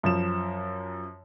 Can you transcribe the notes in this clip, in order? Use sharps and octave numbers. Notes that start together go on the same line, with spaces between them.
F#2 F3 E7